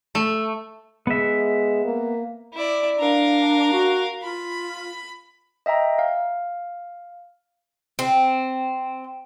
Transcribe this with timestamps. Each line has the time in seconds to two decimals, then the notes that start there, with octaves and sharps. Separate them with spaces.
0.15 A3
1.07 G#3 B3 E5
1.84 A#3
2.54 E4 D5
2.99 D4 A#4 F5
3.73 F#4
4.23 F4 B5
5.66 D#5 E5 G5 A#5
5.99 F5
7.99 C4